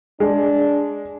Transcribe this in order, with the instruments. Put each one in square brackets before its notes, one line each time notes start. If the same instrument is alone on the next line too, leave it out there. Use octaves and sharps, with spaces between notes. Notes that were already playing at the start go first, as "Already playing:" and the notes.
[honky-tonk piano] G#3 [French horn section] D4